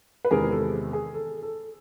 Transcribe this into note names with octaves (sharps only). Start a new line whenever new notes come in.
B4
E2 C3 D#3 G#3 B3 G#4 A#4
A4
G#4
A4
A4